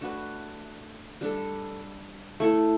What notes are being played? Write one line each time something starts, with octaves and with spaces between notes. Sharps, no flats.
A3 D4 F#4 B4
G3 D4 A4
A3 E4 A4